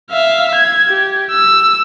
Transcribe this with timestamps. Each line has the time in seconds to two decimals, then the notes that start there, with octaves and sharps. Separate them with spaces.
0.11 E5 F5
0.55 G#6
0.87 G4
1.31 E6